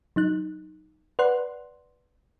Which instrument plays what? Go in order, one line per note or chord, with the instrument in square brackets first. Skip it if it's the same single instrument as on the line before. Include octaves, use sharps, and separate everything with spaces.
[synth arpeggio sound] F#3 D#4 F#6
B4 D5 F#5 C6 F#6